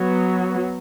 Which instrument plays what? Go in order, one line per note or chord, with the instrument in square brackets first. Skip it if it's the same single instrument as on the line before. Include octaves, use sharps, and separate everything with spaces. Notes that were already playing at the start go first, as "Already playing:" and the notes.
Already playing: [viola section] F#3 B3